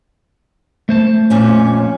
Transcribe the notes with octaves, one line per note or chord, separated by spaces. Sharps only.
A3 C5 A5
F2 A#2 C#4